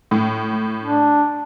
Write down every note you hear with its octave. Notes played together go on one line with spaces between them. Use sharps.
A2
D4